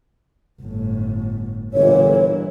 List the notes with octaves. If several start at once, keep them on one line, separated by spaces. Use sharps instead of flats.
G1 A2
G1 A#2 E3 E4 C#5